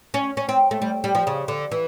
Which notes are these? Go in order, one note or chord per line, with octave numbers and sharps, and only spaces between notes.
C#4
C#4
C4
A3
G3
G3
F3
C#3
D3
E3